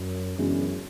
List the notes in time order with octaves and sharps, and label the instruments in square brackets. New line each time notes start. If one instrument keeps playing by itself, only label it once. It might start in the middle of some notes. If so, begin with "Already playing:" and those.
Already playing: [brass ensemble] F#2
[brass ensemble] F#2 [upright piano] C#3 E3 G#3 B3 D4